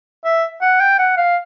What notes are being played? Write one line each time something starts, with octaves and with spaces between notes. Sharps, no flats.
E5
F#5
G5
F#5
F5